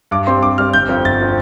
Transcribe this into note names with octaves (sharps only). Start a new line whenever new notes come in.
G2 D6
G3 C4 C6
G2 D6
G3 C4 F6
G1 G6
F2 F3 C4
G1 A6
F3 C4